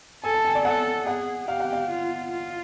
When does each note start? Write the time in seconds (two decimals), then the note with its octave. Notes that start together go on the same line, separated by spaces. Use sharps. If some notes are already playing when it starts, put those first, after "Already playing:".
0.24 A4 G#5
0.34 A5
0.45 G#5
0.55 D5
0.65 A4 F#5
1.07 G#4 F#5
1.48 G4 F5
1.60 F#5
1.73 F5
1.90 F4
2.31 F4